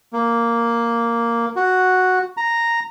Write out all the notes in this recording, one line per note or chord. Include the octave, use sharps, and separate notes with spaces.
A#3
F#4
A#5